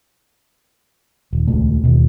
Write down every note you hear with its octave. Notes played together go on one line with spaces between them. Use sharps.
D#1
D#1 C#2 A3
D#2 B2